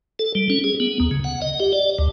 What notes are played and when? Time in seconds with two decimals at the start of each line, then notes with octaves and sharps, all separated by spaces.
0.19 A4
0.35 G3
0.50 C#4
0.64 G#4
0.80 B3
1.00 D#2
1.11 C#3
1.24 F#5
1.42 D#5
1.60 G4
1.73 D5
1.98 D2